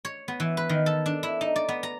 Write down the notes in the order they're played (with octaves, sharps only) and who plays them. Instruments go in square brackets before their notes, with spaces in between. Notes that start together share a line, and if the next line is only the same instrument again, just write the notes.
[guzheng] C#5
B3
E3
B4
D#3
A4
D4
E4
D#4
D5
B3
A#5